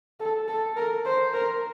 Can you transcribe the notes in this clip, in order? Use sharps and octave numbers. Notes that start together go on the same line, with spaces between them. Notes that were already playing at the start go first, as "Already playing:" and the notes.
A4
A4
A#4
C5
A#4